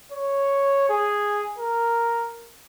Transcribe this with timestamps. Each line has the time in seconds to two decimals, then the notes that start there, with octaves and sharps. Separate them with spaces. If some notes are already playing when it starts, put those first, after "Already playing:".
0.12 C#5
0.90 G#4
1.58 A#4